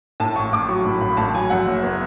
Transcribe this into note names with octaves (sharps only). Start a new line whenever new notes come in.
A2 A5
A1 C#6
A1 D6
F#3 C#6
A2 B5
A1 B5
B5
A1 A5
F#3 G#5
F#2 F#5
F#1
B3 C#5